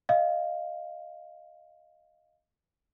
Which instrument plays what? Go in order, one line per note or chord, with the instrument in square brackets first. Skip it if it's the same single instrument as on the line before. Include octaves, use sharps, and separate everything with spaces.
[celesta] D#5 F5